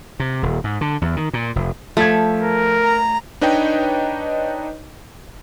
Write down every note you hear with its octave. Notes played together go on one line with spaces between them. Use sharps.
C3
D#1
G#2
D3
E2
D#3
A#2
F1
F3 A3 G#6
A#4
A#5
D4 D#4 B4 C#5 D#5 G5